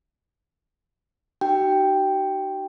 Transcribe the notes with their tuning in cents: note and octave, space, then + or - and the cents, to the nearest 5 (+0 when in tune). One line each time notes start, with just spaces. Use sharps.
D#4 -25 F#4 +45 G5 +0